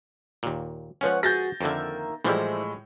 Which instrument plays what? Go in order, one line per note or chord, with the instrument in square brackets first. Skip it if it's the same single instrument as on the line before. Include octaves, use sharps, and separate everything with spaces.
[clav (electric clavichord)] D#2 A#2
[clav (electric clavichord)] F3 G#3 C#4 [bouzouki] B4 C#5 F#5
[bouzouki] F#4 G#4 [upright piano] G6 A6 A#6
[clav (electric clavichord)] F2 D3 [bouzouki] D#3 A#3 E5
[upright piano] A2 G#3 [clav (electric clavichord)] E3 F3 G3 [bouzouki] D4 E4 C5